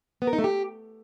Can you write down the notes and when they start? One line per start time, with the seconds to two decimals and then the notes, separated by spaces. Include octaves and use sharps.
0.22 B3
0.27 A#4
0.33 D#4
0.38 A3
0.44 G4